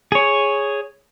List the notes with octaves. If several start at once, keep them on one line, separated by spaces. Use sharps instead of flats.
G#4 C#5